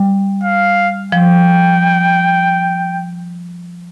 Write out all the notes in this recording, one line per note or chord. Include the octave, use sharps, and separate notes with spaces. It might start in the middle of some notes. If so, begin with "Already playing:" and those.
Already playing: G3
F5
F3 G5